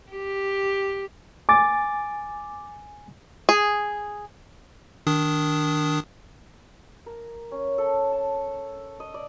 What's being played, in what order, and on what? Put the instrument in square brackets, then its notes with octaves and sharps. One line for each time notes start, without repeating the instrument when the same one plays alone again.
[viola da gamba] G4
[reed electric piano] G#5 A6 [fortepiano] D6
[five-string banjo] G#4
[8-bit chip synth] D#3 D4 D#6
[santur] A#4
C#4
A4
A5
D#5
D5